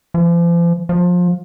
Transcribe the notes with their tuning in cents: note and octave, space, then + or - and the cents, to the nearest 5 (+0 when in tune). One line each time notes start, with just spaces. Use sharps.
F3 -40
F3 +25